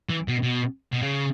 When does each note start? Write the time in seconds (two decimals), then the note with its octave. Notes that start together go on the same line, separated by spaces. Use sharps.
0.09 E3
0.28 B2
0.43 B2
0.93 B2
1.03 C#3